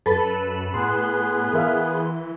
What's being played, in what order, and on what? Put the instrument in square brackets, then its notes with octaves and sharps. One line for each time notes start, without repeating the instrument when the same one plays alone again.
[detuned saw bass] F#2 [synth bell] A4 B4 B5
[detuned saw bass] A2 [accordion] B3 G#4 B4 [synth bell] C6
[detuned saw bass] E3 [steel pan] A#4 E5 F5